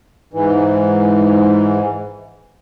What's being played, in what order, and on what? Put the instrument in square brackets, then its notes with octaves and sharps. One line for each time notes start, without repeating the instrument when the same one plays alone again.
[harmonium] G#2 E3